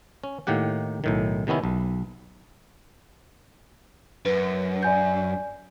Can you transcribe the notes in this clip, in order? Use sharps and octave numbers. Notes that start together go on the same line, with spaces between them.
C#4
A2 D#3 A#3 G4 F#5
B1 A2 D#3
C3 D#3 B3 C#4 E4
B1
F#2 B4
D5 G#5 G6